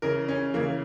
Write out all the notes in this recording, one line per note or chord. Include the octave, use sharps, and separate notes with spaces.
C#3 E3 A#4
C#4
C#3 E3 A#3